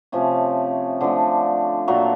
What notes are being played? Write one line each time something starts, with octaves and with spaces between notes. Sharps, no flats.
C3 F3 A3 C#4
D3 F3 A3
A#2 F#3 A3